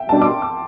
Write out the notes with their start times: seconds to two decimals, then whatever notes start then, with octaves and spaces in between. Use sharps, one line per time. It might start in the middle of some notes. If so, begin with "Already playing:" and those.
Already playing: E5 G5
0.08 B2 G3 D4 A5
0.22 D6
0.25 C6
0.42 D6